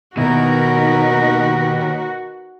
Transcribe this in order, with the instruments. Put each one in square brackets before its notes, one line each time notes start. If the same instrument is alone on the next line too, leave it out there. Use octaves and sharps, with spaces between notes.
[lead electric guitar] D#2 D#3 [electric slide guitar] B2 E4 [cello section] D#4 A#4 B4 [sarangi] F#4